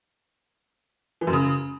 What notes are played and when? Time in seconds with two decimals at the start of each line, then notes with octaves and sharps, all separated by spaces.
1.21 E3
1.27 F#2
1.33 C#3